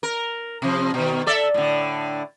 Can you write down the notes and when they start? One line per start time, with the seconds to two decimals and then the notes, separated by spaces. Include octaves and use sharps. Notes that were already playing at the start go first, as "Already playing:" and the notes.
0.03 A#4
0.62 C3 F3
0.94 B2 D#3
1.27 A4 D5 E5
1.54 A2 D3